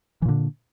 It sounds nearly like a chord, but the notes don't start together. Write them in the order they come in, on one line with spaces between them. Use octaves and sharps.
E3 A#2 D3